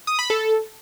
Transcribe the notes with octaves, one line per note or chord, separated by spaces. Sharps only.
D#6
B5
A4